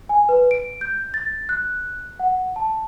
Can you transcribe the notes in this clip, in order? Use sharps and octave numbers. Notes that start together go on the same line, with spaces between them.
G#5
B4
D7
G6
A6
F#6
F#5
A5